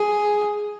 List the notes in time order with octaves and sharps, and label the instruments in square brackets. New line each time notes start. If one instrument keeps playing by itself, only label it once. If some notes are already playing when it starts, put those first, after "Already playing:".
Already playing: [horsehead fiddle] G#4